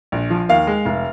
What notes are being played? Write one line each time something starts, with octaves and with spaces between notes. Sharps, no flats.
A#1
F3
D#2 F5
G#3
F1